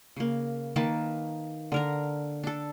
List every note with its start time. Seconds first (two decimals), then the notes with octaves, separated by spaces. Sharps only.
0.16 C#3 A#3
0.76 D#3 A#3 B4 A5
1.72 D3 A#4 A#5
2.44 D4 A4